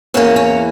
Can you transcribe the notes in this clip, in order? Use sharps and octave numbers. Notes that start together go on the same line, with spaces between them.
E2 E3 A#3 C#4
C#4